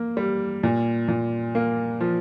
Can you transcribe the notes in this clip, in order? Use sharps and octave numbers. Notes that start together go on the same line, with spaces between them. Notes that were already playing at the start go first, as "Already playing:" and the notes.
Already playing: A#3
G3
A#2
A#2
A#3
F3